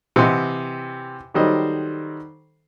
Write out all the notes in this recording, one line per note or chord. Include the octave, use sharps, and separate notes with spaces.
C3 E3 G4 D#5 F#5 C6
D#3 F#3 G3 A4 C5 D#5